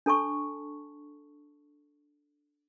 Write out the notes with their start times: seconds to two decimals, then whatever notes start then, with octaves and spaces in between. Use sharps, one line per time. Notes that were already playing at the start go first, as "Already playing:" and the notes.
0.06 D4 A4 A5 C#6